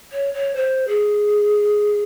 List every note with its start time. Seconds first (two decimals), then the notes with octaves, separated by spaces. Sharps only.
0.12 C#5
0.34 C#5
0.55 C5
0.88 G#4